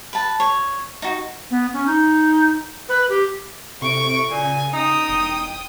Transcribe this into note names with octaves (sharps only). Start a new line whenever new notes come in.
B4 A5
C#5
D#4 F#4
B3
C#4
D#4
B4
G4
A2 C3 C#6 D7
A#2 C#3 G#5
D#4 G5 D#6
E1